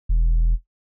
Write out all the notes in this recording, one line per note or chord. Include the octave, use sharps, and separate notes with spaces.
E1